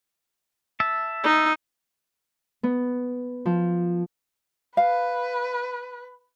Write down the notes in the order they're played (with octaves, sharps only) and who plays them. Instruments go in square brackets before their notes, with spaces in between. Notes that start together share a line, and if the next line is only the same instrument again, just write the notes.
[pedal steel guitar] E5 A5
[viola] D#4
[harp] B3
F3
[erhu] B4 [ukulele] F5